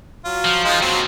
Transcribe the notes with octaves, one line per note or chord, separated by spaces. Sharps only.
F#3 F4
F3
G#3 D#4 F4
D#2 F3 F#3 C4